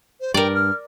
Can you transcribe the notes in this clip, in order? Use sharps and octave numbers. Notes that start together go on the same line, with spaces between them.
C5
G2 A#4 D5 G5
F6